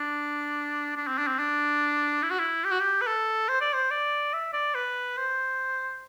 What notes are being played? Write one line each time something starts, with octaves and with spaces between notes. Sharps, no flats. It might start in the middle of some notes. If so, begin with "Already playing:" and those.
Already playing: D4
D4
C4
D4
C4
D4
E4
F#4
E4
G4
F#4
G4
B4
A4
C5
D5
C5
D5
E5
D5
B4
C5